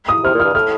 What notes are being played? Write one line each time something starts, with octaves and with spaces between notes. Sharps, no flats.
D#6
C3 F6
A#2
F6
G2
A2 F6